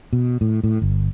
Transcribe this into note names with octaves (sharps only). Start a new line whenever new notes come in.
B2
A2
A2
G1